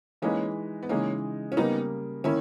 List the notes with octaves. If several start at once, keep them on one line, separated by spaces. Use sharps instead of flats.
E3 G#3 A#3 C#4 D#4 G#4 B4
B3
C#3 E3 G#3 A#3 C#4 D#4
C#4
C#3 G3 A#3 B3 D#4
D#3 A#3 C#4 E4